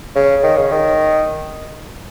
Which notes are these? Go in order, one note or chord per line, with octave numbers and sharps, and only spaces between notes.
C#3
D#3
C#3
D#3